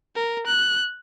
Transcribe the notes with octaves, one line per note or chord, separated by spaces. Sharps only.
A#4
F#6